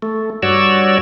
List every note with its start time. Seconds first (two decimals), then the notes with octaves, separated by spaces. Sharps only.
0.02 A3
0.42 G2 F#4 C#5 D5 E6